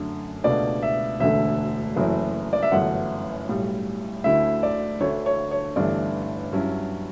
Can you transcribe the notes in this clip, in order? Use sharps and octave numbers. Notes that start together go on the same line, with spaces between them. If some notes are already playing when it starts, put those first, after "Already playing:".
Already playing: F#2 D3 A3
C#2 B2 A3 D4 D5
E5
E1 D2 D3 A3 E5
F#1 F#2 E3 A3 E4
D5
E5
G1 F#2 E3 A3 F#5
B1 A2 G3
D2 D3 A3 E4 E5
D5
D2 D3 A3 D4 C#5
C#5
C#5
G1 G2 E3 A3 D5
G2 F#3 C#4 E4